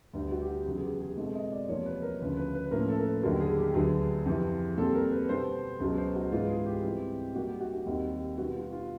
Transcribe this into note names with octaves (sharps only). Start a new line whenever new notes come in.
D2 D3 G3 B3
F#4
G4
F#4
E2 C#3 F#3 B3 F#4
G#4
G4
G#4
B2 G#3 C4 A4
D#5
D5
E2 C3 F3 A#3 C#5
B4
A#4
D2 C#3 F3 B4
B4
B4
B4
A2 F3 A#3 C#4 A#4
A4
A#4
B4
D#2 D3 F#3 A#4
G#4
G4
D2 D3 F#3 B3 G#4
F2 C3 E3
A#2 G3 C4 A4
A#4
B4
B2 G3 B3 C5
C#2 B2 F#3 B3
C5
F#4
G#2 E3 G#3 B3 F4
G#4
G4
C3 E3 G3 C4
A#2 G3 A#3 F#4
G4
F#4
F#4
D#2 D#3 G3 C4
B2 G3 B3 F#4
F4
F4